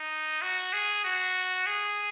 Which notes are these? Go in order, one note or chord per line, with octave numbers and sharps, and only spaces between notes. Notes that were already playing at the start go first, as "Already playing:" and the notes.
Already playing: D#4
F#4
G#4
F#4
G#4